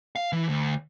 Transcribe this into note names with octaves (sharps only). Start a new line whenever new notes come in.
F5
E3
D2